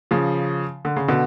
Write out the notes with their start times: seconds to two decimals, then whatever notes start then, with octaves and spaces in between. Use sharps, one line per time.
0.11 C#3 F3
0.85 D3
0.96 C#3
1.08 B2 D3